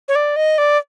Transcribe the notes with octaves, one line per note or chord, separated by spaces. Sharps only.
C#5
D5
D#5
D5